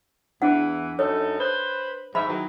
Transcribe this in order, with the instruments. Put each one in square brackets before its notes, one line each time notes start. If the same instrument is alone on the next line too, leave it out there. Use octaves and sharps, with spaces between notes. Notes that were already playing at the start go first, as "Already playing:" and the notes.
[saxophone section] E2 E3 [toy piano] D4 F#5
[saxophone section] F#2 D#4 A4 [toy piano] C#5
[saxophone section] B4 C5
[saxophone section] G#2 E5 [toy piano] B5
[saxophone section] D#3 E3 F#3